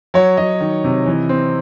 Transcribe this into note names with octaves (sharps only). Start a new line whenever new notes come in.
F#3 C#5
F#3 D#5
D#3
C3
E3
C4